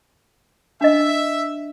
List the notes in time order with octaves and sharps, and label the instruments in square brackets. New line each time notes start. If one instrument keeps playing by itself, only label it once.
[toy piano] D4 D#5 [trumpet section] E5